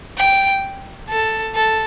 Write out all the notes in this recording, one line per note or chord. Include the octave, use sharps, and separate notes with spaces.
G5
A4
A4